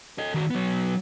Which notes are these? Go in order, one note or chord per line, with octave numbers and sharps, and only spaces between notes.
A4 D#5
D#3 F#4
F#3 B3